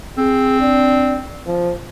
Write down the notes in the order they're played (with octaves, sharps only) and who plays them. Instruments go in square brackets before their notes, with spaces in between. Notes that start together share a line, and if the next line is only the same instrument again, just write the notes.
[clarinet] C4 [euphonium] G#4
[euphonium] D4
F3